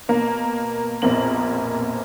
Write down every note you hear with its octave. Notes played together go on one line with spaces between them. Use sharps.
B2 A#3
A#1 F2 B2 A#3 C4 F#7